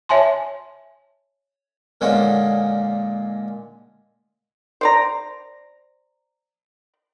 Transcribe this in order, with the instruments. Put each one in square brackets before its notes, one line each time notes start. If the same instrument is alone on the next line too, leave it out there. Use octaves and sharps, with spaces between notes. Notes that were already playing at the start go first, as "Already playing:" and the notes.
[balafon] C#5 E5 G#5 A5 C6
[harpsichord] A#2 D3 G#3 A#3 C#4 D#4
[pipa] C5 D5 A#5